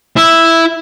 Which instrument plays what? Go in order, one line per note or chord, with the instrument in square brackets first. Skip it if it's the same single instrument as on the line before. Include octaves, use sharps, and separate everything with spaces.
[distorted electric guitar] E4